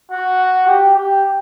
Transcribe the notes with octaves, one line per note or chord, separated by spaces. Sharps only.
F#4
G4
G4